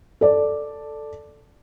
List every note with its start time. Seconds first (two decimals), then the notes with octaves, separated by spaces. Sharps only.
0.21 A4 D5